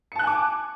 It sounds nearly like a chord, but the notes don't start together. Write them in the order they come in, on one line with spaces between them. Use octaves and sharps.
C#7 A5 F#6 G#5 D6